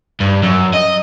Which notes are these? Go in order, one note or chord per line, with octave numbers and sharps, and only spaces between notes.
G2
F#2
D#5